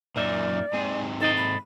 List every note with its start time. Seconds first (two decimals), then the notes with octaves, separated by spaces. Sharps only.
0.16 F#2 A#2 A#3 D#4 D5 E5
0.74 G#2 C3 G#4
1.21 D#4 A4 C5 D#5
1.37 B5